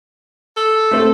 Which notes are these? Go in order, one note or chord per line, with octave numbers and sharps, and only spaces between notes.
A4
A3 C4